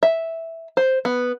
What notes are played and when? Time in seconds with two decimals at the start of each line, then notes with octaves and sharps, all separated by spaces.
0.03 E5
0.77 C5
1.05 B3